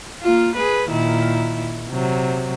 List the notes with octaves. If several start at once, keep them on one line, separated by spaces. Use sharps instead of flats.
A#3 F4
G#4 B4
A#2 D#3 E4
C3 F#3